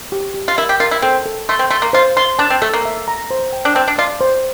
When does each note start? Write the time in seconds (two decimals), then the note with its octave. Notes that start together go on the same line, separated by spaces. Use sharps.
0.12 G4
0.34 G4
0.48 F4
0.58 E4 A#4
0.69 G4
0.80 F4 A#4
0.91 E4
1.02 C4 A4
1.26 A4
1.49 A3 C6
1.59 C4
1.71 A3 C6
1.82 A#3
1.93 F4 C5
2.17 F4 C6
2.39 D4 A5
2.50 C4
2.62 A3 A4
2.74 A#3
2.85 E5
3.08 A#5
3.31 C5
3.52 G5
3.65 D4
3.75 C4 A5
3.88 D4
3.98 F4 D5
4.21 C5